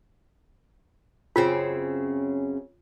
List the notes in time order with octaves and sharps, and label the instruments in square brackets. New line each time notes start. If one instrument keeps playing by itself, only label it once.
[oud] F#2 C#3 C4 [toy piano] F4